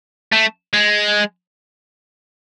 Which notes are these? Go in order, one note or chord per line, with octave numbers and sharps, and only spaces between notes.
A3
G#3